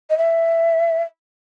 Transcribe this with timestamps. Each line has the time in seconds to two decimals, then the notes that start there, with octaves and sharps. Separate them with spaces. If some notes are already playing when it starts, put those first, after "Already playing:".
0.10 D#5
0.18 E5